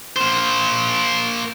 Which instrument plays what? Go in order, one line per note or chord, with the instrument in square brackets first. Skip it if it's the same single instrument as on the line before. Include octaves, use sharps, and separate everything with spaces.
[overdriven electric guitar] A#3 C5